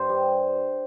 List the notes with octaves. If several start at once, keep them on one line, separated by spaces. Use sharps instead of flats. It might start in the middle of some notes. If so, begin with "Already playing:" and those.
Already playing: G2 C5
G3